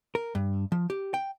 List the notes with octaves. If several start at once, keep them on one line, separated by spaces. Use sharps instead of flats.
A#4
G2
F3
G4
G5